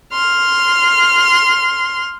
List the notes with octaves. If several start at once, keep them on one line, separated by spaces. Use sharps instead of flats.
C6 F6